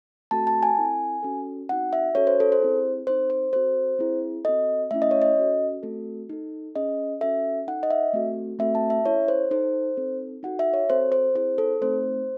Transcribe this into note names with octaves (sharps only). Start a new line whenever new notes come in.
A3 C4 F#4 A4 A5
A5
G#5
C4 E4 A4
C#4 F#4 A4
C4 D#4 F#4 F#5
E5
C#4 F#4 A4 C#5
C5
A4
C5
C4 E4 G#4
C4 D#4 A4 C5
C5
C4 F#4 A4 C5
C4 E4 G#4
C4 F#4 A4 D#5
A3 C#4 E4 E5
D#5
C#5
D#5
C#4 F#4 A4
A3 C4 F#4 A4
D#4 A4
C#4 G#4 D#5
C#4 F#4 A4 E5
D#4 A4 F#5
D#5
E5
A3 C4 F#4 A4
A3 C4 F#4 A4 E5
A5
E5
C#4 E4 A4 C#5
C5
D#4 A4 C5
C4 D#4 A4
D#4 F#4 A4 F#5
E5
C#5
C4 F#4 A4 C5
C5
C4 E4 G#4 C5
A4
A3 C4 D#4 C5